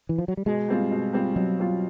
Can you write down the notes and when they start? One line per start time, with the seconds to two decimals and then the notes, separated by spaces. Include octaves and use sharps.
0.09 E3
0.18 F3
0.28 F#3
0.37 G3
0.46 B2 G#3
0.68 G3 C4 F4
0.91 B2
1.13 G3 C4 F4
1.35 B2 F#3
1.58 G3 C4 F4